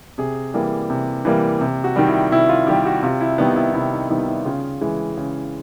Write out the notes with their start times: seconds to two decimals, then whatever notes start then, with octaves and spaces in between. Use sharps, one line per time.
0.18 C3 G#4
0.54 E3 G3 A#3
0.90 C3
1.25 E3 G3 A#3
1.61 C3
1.84 F#4
1.96 D#3 G3
2.08 E4
2.32 C3 E4
2.49 F4
2.67 D#3 G3 G4
2.86 F#4
3.03 C3 F4
3.21 E4
3.38 D#3 G3 B3 D#4
3.56 E4
3.73 C3 E4
3.92 D#4
4.09 D#3 G3 B3 E4
4.28 E4
4.45 C#3 F4
4.81 E3 G#3
5.17 C#3